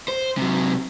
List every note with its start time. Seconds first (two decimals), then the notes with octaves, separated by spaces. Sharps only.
0.08 C5
0.37 C3 F#3